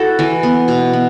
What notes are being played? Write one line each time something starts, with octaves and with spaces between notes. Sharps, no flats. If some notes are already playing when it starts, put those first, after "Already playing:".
Already playing: E4 F#4 A4
E3
B3
B2
B3